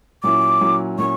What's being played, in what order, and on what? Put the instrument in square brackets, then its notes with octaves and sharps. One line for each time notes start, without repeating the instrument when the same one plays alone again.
[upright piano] A#2 F#3 C#4 E4 [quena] D6
[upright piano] A#2 F#3 C#4 E4
[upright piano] A#2 F#3 C#4 E4 [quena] C#6